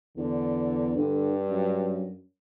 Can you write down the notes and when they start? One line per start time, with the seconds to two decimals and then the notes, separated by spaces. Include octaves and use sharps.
0.17 E2 D3
0.97 G2 D3
1.50 F#2